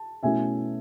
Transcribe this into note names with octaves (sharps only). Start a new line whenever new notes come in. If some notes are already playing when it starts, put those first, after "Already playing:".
Already playing: A5
B2 A3 C#4 E4 E5 G#5